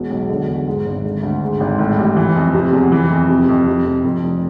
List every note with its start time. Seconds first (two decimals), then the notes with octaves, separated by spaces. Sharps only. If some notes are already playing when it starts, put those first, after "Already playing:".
Already playing: E1 B2
0.11 B1
0.29 D3
0.48 E2
0.67 G#2
0.86 G#1
1.04 D3
1.23 D2
1.42 G#2
1.60 G#1
1.79 A2
1.98 A1
2.17 E3
2.36 F2
2.54 C3
2.73 E2
2.92 E3
3.10 F2
3.29 C3
3.49 F2
3.67 C3
3.85 F2
4.04 F2
4.23 F1